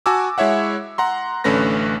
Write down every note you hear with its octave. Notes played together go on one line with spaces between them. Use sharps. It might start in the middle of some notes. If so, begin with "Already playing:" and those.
F#4 G#5 A5 D6 E6
G#3 E4 C#5 E5 F#5
F#5 A#5 C6
A1 D3 A3 C#4 B4 A#6